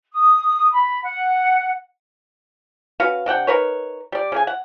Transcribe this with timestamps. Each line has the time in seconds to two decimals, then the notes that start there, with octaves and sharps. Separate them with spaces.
0.14 D#6
0.73 B5
1.03 F#5
3.00 C#4 F#4 B4 F5
3.26 C3 D4 F#5 G5
3.47 D#4 A#4 B4 C#5
4.12 G3 D5
4.32 C#3 G#4 G#5
4.47 F#5